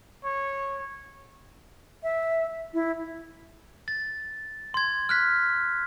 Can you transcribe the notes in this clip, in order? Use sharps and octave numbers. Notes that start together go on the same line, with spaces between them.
C#5
E5
E4
A6
C6 G#6
F6 F#6 B6